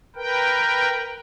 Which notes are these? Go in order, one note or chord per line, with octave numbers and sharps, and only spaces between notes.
A#4 B4 G5